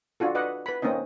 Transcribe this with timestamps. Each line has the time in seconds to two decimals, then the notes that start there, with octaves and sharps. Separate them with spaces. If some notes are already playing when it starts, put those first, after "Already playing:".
0.20 D4 F4 F#4 A4
0.35 B4 D5 D#5 F#5
0.66 B4 B5
0.82 A#3 C4 C#4 D#4 D#5